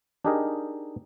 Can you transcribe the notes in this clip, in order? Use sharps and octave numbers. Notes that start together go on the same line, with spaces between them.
D4 D#4 G4 G#4 A#4 D#5